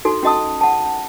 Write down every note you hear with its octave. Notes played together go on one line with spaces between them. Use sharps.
D#4 F#4 A4
C#4 F#4 D#5 A5 D#6
F#5 A5